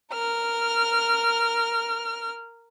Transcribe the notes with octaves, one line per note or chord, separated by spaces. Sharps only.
A#4 F6